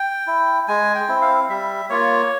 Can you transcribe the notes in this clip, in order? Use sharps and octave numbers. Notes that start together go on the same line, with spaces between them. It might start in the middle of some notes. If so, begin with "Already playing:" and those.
Already playing: G5
E4
G#3 G#5
G5
C4 E4
F5
G3 E5
A#3 F4 C#5